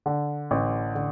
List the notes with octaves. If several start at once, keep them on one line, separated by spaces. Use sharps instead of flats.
D3
A1
D3